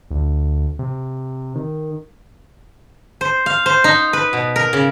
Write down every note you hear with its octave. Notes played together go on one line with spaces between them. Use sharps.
D2
C3
D#3
C5
F5
C5
D#4
B4
B2
A#4
C#3